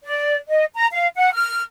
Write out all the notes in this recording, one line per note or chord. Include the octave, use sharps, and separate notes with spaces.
D5
D#5
A#5
F5
F#5
F6